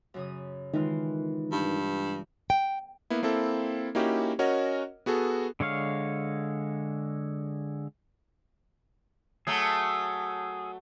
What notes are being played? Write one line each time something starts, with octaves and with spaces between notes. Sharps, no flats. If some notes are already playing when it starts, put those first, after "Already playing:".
F#2 C#3 D#6
D#3 E3 G#3 F4
G2
G5
A#3 B3 E4
A#3 C4 E4 A4
A#3 C#4 D#4 E4 F#4 G4
C#4 F#4 A#4 C#5 D#5 F#5
B3 F#4 G#4 A4
D3 G#3 C#5 F5
F#3 A3 G#4